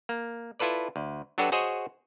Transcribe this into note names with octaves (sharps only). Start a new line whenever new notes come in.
A#3
E4 F4 A4 B4 D5
D2
F#3 D4 F#4 G4 A4 B4
F#4 G#4 C5 C#5 D#5